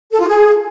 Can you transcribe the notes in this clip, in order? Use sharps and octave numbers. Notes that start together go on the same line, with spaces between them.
A4
F4
G#4